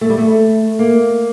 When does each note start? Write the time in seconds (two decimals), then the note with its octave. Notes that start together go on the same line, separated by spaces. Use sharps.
0.01 A3
0.09 G3
0.18 A3
0.79 A#3